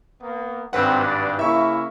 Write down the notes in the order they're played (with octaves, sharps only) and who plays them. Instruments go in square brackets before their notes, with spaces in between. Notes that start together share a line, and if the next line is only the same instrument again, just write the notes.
[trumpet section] A#3 B3
[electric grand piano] G#1 B4 F#5 [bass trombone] G2 [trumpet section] C4
[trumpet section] D5
[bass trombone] C#3 [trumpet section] A#3 [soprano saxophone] E4 [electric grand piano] E5 C#6